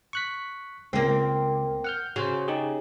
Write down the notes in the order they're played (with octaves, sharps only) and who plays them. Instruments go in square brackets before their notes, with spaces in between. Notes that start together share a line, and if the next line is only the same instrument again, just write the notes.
[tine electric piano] C#6 F#6 B6
[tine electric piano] C#2 [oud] A#3 C4
[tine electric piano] F#5 F6 G6
[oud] C#3 [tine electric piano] F#4 C5
[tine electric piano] D#4 G4 G#4